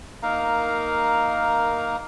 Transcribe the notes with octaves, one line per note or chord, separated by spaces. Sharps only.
A#3 D#4 A#4 F5 A#5